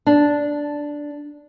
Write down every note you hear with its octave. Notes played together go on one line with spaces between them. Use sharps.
D4